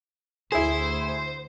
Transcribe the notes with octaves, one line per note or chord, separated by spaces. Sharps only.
D2 E4 G#4 C5